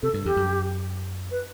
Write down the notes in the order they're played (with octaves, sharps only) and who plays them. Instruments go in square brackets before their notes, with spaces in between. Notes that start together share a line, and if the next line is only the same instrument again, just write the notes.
[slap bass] C3 [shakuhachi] A4
[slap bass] G2
[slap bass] E2 [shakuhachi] G4
[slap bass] F#2
[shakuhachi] B4